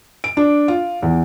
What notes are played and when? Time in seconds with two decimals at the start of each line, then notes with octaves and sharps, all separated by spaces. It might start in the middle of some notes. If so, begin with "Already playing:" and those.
0.24 D7
0.37 D4
0.68 F4
1.02 E2